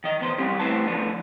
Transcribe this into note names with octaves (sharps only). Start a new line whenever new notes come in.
D#3 D#5
D#3 B3 C5
G3 C4 C#4 G4
A3 C#4 E4 B4 C5 A5
D3 F3 A3 B3 D4